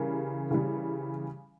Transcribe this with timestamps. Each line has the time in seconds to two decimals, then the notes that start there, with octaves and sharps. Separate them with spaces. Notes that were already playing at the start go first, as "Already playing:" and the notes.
Already playing: C#3 E3 G3 A#4
0.51 C#3 E3 G3